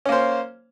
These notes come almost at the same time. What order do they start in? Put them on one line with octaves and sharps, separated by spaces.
C#4 A#3 C5